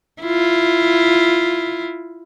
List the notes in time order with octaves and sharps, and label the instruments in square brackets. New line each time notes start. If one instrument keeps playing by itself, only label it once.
[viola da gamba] E4 F4